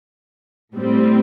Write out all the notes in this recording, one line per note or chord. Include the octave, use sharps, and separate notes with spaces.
A2 G3 C4